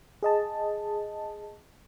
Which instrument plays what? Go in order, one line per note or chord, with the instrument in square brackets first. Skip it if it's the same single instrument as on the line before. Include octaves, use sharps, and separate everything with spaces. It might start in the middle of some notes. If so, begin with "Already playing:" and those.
[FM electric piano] G#4 D#5 A5